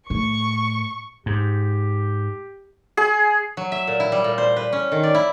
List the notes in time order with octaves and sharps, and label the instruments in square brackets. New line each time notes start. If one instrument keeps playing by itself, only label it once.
[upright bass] A2 [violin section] C#6
[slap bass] G#2 [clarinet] G4
[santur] G#4
[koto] F#3
E5
A#2
E4
G3
A#2
C5
B4
C#4
D#3
D5
E4